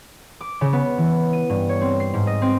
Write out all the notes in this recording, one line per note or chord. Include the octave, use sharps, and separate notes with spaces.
D6
C#3
B3
E3
D#7
G2
C#5
C4
C7
G#2
D#5
C4